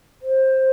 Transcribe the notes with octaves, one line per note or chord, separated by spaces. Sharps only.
C5